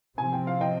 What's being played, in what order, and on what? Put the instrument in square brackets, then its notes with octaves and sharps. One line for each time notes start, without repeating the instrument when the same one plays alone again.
[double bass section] C3 F3 C4 [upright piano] G#5
[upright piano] G5
F5
D#5 G5